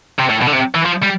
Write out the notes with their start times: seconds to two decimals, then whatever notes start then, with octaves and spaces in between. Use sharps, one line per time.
0.19 C3
0.29 A2
0.42 B2
0.47 D3
0.53 C3
0.75 E3
0.86 F3
1.03 G3